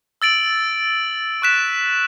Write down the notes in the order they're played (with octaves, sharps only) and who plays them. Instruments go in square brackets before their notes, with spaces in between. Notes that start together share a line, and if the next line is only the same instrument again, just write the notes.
[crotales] E6 A6 D7 F#7
C#6 F#6 B6 E7